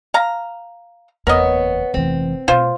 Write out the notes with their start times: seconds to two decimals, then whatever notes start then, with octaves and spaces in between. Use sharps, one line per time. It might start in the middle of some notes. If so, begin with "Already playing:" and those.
0.14 F5 A#5
1.27 F#1 E2 B3 A#4 C#5 D#5
1.94 F1 E3 C4
2.48 B2 A3 F4 C5